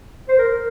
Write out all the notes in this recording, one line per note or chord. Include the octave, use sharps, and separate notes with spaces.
C5
A#4
A#4